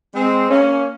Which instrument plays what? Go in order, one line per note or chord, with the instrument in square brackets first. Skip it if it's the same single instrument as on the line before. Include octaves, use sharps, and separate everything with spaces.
[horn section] G#3 C4
A#3 C#4